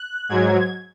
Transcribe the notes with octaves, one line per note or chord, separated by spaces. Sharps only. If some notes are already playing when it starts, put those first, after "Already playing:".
Already playing: F#6
G#2 F#3 G#6